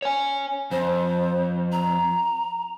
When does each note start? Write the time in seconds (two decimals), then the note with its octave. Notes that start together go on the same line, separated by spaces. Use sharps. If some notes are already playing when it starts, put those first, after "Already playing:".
0.02 C#5 G#5
0.71 F2 C5
1.72 A#5